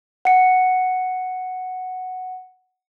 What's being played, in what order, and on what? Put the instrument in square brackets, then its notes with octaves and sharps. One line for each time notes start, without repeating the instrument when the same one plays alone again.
[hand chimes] F#5 C#7